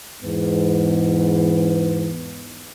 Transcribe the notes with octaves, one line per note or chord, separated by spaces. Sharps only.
E2 G#2 B3